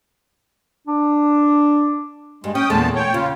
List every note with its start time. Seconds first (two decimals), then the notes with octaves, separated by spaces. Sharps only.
0.87 D4
2.44 G2 G#3
2.55 C#4 G5 D#6
2.70 E2 A#2 G#3 A3 A5
2.96 C#5 G5
3.14 C#3 F4